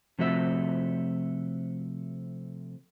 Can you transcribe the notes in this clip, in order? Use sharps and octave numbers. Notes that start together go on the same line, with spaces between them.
C3 F3 A3 F#4 E5